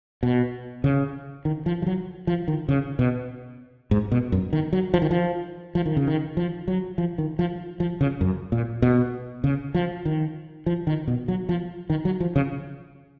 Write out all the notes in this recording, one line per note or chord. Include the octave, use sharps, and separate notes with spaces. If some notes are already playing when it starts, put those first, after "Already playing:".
B2
C#3
D#3
F3
F3
F#3
F3
D#3
C#3
B2
G#2
B2
F#2
D#3
F#3
F3
D#3
F3
F3
D#3
C#3
D#3
F3
F#3
F3
D#3
F3
F3
C#3
F#2
A#2
B2
C#3
F3
D#3
F3
D#3
B2
F#3
F3
D#3
F#3
F3
C#3